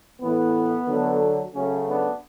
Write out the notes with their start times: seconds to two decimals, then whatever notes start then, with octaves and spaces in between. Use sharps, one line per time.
0.21 A2 E3 A3 B3
0.87 D3 F#3 A3
1.53 C#3 F#3 A3 C#4
1.87 B3 D4